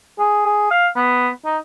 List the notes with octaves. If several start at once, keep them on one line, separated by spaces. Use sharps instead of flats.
G#4
G#4
F5
B3
D#4